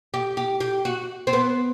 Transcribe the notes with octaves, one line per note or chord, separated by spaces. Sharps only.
G4
G4
G4
F#4
C4
B3